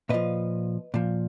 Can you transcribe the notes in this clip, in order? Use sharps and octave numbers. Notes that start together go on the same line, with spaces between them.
A#2 F3 B4 D#5
A#2 F3